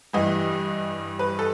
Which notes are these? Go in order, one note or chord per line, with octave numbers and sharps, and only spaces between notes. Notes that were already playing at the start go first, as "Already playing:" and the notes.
G2 E3 G3 D#5
B4
A4